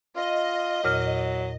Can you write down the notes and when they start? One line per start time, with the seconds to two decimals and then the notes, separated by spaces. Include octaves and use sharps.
0.16 F4 D#5
0.84 E2 A#2 F#3 F6